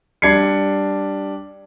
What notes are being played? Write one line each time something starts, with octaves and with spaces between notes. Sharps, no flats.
G3 D4 G#6 C7 C#7